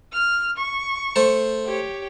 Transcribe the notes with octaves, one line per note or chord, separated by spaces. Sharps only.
F6
C#6
A3 C5 A5
G4 C#5